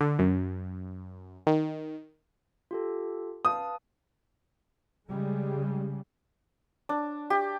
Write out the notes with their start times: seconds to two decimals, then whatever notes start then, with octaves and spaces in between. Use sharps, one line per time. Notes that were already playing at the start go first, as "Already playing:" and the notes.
0.01 D3
0.19 F#2
1.47 D#3
2.71 F4 G4 A4
3.45 B4 F5 A5 D#6
5.08 C#3 G3 G#3
6.89 D4
7.30 G4